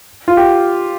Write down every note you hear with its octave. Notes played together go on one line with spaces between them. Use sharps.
F4
G4